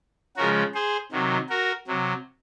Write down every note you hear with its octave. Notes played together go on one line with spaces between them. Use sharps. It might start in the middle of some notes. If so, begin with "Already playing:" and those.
C#3 F3 G#3 F#4 A#4
G#4 C5
C3 D#3 F#3
F#4 A#4
C3 F#3